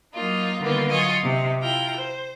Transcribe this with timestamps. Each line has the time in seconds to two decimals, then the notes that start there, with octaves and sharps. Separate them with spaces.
0.14 F#3 A#3 D#4 F4
0.60 D3 D#3 G3 A#3 B3 F4
0.89 F#3 F4 D#5 G#5 C#6
1.22 C3 D#4
1.60 E4 F4 G5 A#5
1.95 C5